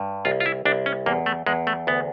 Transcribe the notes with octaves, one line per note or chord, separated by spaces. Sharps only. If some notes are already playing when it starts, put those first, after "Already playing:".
Already playing: G2
C2 F4
F4
E4
C2 D4
C#4
E2 A#3
A3
E2 G#3
A3
D2 B3